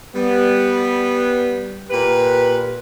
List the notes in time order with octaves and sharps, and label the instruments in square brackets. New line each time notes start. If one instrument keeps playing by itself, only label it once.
[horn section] G3 B3
A#2 G4 B4